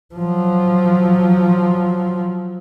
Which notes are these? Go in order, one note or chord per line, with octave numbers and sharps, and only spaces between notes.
F3 F#3